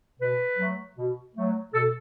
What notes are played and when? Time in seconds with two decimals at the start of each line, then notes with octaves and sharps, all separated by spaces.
0.19 B2 B4
0.58 F#3 A3
0.96 B2
1.35 F#3 A3
1.72 B2 A4